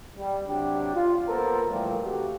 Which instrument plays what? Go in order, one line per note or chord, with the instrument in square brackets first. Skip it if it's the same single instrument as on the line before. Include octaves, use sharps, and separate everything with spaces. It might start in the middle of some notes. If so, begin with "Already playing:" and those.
[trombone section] G3
C3 F#3 D4 G4
F4
A#3 B3 A4 A#4 C5
A#2 E3 F3 G3 A3 A#3
C3 A3 F#4 G4